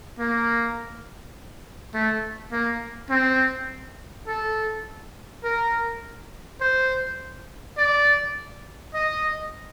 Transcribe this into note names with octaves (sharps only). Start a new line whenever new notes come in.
A#3
A3
A#3
C4
A4
A#4
C5
D5
D#5